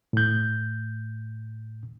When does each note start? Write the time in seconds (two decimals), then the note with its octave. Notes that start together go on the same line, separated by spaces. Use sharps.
0.13 A2 G6